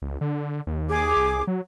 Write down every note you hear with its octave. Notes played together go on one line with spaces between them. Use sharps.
C#2
D3
D#2
G#4 D6
C2
F#3